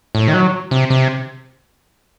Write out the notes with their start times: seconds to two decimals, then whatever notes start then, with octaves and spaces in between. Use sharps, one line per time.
0.15 A2
0.28 D#3
0.34 F#3
0.71 C3
0.90 C3